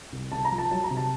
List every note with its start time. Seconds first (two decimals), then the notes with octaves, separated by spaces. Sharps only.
0.12 C2
0.32 C2 A5
0.45 A#5
0.51 F3
0.58 A5
0.71 F#3 A5
0.84 A#5
0.91 C3
0.97 A5